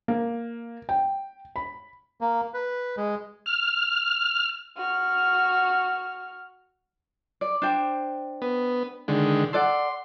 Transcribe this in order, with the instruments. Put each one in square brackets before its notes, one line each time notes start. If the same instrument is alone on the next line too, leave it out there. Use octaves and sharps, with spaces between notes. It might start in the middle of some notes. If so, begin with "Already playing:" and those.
[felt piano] A#3
G5
B5
[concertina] A#3
B4
G#3
[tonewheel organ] F6
[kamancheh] F#4 F6
[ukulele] D5
D4 C5 G5
[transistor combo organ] B3
D3 D#3 G#3
[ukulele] A4 D5 F#5 [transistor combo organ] C6